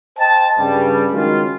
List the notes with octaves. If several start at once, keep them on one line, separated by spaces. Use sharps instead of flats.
C5 D#5 G5 A5
G2 C#3 G3
D#3 F#3 G#3 C#4 F4